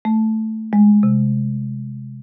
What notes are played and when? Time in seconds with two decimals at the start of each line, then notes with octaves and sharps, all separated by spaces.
0.05 A3
0.73 G#3
1.03 C3